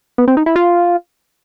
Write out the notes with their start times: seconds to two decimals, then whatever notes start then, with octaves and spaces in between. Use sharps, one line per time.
0.18 B3
0.28 C4
0.37 D#4
0.46 E4
0.56 F4